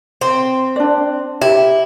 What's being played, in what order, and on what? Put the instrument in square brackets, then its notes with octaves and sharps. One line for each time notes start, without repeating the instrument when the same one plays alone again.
[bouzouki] C4
[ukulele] D4 D5
[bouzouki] E4 [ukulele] G4